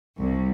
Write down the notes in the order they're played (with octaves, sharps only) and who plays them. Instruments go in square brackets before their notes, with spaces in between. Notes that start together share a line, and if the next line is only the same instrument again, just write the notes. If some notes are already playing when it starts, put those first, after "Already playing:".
[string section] C2